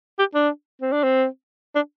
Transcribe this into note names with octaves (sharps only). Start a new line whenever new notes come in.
G4
D4
C4
D4
C4
D4